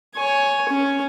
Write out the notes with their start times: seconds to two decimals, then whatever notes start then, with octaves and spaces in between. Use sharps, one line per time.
0.16 C#5 G#5
0.69 C#4